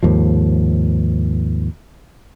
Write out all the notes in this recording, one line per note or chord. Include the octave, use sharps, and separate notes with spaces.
D#2 G#2 F3